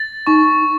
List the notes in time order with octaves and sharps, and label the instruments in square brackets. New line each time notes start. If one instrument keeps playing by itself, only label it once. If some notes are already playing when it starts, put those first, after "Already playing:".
Already playing: [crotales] A6
[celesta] D#4 [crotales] C#6